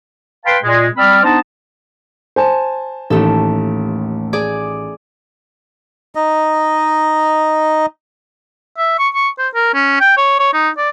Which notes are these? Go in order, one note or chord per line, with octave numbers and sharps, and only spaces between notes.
B4 F5 G5 A5 B5 C6
A#2 G#3
G3 C4 D5 B5 E6 F6
B3 D4 D#4 C5 D#5 A5
C5 G#5 A5
A1 D#2 D#3 A3 A4
G#4 D5 D6
D#4 D#5
E5
C#6
C#6
C5
A#4
C#4
G5
C#5
C#5
D#4
D5